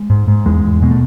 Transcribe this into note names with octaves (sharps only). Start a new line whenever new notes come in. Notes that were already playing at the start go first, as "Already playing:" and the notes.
Already playing: G#3
G#2
G#2
E2 G#3
E2
B2 G#3
A3